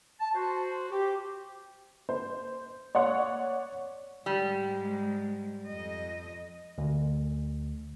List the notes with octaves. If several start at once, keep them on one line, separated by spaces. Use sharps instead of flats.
A5
F#4 C5
G4
C5
C#5 D5 F#5 C#6
G#2 G3 G#3
F2 D#5
D2